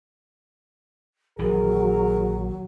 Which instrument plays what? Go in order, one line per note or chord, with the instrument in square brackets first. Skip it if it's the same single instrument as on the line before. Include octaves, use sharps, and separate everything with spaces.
[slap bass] A#1 D#3 E3 [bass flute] F#3 [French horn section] G#4 A#4